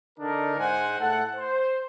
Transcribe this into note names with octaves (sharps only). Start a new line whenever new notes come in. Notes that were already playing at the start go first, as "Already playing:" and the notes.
D3 D4 D#4 A#4
G#2 G#3 C5 F#5 G#5
A2 A4 F#5
C5